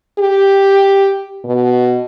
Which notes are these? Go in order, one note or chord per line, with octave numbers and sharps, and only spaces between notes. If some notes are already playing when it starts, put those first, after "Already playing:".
G4
B2